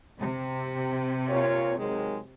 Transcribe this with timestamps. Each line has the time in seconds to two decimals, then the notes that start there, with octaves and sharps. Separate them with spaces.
0.20 C3
1.29 A#2 F4 C#5
1.78 D#3 F#3 G#3